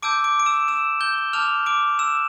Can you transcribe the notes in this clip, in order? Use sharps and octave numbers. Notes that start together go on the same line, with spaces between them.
A5 D6 E6 G6 D7
D6 D7
D7
E6 E7
E6 E7
G6 G7
A5 D6 F6 G6 F7
D6 D7
E6 E7